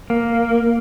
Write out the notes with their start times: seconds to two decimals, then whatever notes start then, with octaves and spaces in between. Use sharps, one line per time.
0.10 A#3